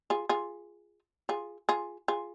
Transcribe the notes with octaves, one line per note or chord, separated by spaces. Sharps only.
F4 G#4
F4 G#4
F4 G#4
F4 G#4
F4 G#4